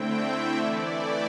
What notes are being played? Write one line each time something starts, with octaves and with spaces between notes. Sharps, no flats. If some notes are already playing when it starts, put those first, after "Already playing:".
Already playing: D3 A3 C4 E4 G5
E5
E3 A3 E4 D5
G5